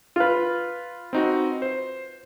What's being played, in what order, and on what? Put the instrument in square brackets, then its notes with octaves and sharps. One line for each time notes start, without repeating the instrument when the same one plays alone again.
[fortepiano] F4 B4
[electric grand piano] C4 D#4 F#4
C5